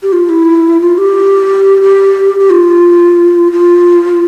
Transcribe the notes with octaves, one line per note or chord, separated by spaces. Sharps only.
G4
F4
E4
F4
G4
G4
G4
F4
F4